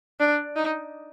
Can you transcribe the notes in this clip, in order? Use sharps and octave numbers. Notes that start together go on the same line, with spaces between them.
D4
D#4